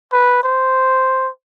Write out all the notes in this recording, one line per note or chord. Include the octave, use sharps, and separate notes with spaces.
B4
C5